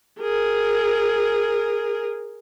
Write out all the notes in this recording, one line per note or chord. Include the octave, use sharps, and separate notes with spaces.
G#4 A#4